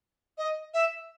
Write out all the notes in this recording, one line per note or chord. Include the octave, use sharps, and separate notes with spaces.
D#5
E5